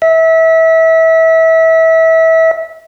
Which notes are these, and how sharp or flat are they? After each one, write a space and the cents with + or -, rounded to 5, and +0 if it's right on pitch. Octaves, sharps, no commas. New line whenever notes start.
E5 -25